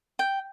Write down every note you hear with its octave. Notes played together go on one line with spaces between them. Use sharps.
G5